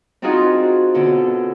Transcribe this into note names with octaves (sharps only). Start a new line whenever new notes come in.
C4 D4 D#4 F4 F#4 G#4
B2 D3 C#4